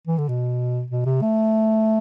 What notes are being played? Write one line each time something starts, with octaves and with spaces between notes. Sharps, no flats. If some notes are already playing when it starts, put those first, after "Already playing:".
E3
D3
B2
B2
C3
A3